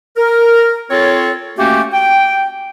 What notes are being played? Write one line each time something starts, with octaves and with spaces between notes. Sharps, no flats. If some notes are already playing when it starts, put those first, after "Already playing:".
A#4
C4 F4 A4 C#5
A3 A#3 C#4 F#4 G4
G5